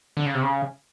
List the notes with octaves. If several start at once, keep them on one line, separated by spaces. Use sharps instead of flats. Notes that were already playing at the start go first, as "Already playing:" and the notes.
D3
C#3
C3
C#3